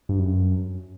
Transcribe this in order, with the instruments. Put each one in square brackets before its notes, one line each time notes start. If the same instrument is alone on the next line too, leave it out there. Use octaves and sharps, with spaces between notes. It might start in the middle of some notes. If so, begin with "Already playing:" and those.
[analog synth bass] G2
F#2